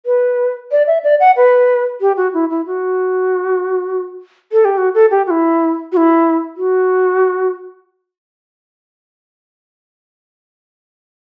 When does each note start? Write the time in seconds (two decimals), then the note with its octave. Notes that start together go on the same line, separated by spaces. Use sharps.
0.06 B4
0.72 D5
0.87 E5
1.04 D5
1.20 F#5
1.37 B4
2.01 G4
2.17 F#4
2.34 E4
2.50 E4
2.66 F#4
4.52 A4
4.65 G4
4.78 F#4
4.95 A4
5.11 G4
5.27 F#4
5.31 E4
5.92 F#4
5.97 E4
6.57 F#4